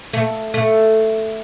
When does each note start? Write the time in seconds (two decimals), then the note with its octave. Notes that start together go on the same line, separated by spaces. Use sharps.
0.13 A3
0.54 A3